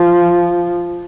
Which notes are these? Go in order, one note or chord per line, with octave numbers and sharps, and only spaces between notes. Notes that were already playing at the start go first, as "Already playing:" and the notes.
Already playing: F3